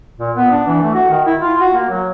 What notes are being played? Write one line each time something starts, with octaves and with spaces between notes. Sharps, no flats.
A#2
B3
D4
E3
A3
F#4
D#3
E4
F4
F#4
A#3
F#3